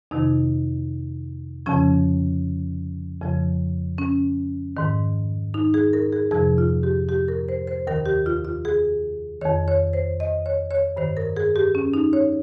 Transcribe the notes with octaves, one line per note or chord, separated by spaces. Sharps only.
F2 C3 D#3 D#4
F2 C#3 F3 C#4
F2 C#3 F3
C#4
G#2 D#3
D#4
G#4
A#4
G#4
F2 C3 F3 G#4
F4
G4
G4
A#4
C5
C5
D#2 D#3 A#4
G4
F4
F4
G#4
F2 D#3 C#5
C#5
C5
D#5
C#5
C#5
G2 D#3 C5
A#4
G#4
G4
C#4
D#4
C#5